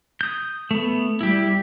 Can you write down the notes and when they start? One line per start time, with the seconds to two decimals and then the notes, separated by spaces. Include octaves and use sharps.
0.21 D#6 G6
0.71 A3 B3
1.21 G3 E4 G4